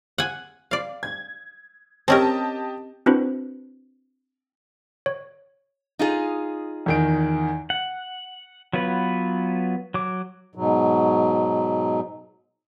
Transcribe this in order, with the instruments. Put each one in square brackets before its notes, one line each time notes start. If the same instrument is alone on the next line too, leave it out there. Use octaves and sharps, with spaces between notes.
[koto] F#5 G#5
D5 F5
[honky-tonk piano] G#6
[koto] C4 C#4 A#4 [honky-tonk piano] G4 D#5 A5
[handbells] C4 D4 E4 F#4 B4 C5
C#5
[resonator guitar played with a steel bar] D#4 F4 G#4
[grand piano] E2 D#3 D7
[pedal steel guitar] F#5
F#3 B3 F4 B4
F#3 D6
[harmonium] G#2 B2 F#3